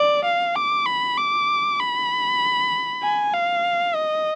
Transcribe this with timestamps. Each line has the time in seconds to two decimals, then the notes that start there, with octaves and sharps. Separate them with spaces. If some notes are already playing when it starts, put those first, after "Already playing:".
Already playing: D5
0.24 F5
0.56 D6
0.86 B5
1.18 D6
1.80 B5
3.03 G#5
3.34 F5
3.95 D#5